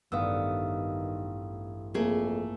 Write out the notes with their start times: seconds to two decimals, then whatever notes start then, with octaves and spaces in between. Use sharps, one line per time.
0.12 A1 G2 D#3 B3 F5 D#6 E6
1.94 F2 A3 A#3 G#4